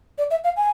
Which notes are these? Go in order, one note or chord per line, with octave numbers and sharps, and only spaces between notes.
D5
E5
F5
G#5